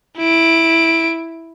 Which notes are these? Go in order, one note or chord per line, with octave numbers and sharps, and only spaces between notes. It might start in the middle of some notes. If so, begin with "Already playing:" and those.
E4 D7